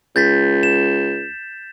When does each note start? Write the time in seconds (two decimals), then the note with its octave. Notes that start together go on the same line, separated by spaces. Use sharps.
0.16 C#2 G6 A6 B6
0.63 E7